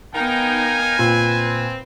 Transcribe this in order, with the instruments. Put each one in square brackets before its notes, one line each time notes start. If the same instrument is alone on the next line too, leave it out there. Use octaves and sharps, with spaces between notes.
[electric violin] B3 G5 [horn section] D#4 A#4 F5 [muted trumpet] G#5
[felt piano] A#2 [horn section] C4 [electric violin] B4